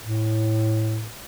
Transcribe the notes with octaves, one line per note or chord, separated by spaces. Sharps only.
A2